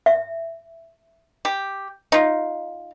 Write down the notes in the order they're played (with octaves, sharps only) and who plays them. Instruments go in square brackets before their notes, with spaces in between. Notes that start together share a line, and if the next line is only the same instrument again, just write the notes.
[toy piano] E5
[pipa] G4
D#4 F4